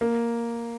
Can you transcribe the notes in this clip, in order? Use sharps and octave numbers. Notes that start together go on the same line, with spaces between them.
A#3